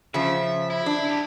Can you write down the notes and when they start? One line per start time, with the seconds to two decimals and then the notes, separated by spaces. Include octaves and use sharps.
0.14 C#3 F3 E5
0.70 E4
0.86 D4
1.05 E4 G4